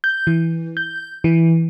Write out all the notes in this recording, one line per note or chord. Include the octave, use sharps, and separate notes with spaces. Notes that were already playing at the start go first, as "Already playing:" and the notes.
G6
E3
G6
E3